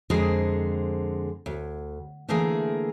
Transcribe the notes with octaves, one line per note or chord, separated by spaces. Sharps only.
F2 D3 G#3 G#4 A#4 C5
D2
D3 E3 A3 A#3 G#4 A#4